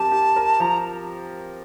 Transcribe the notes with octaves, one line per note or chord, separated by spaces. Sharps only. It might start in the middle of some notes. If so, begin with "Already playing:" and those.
Already playing: F3 C4 G4 A#4 A5
G4
A#4
F3 A#5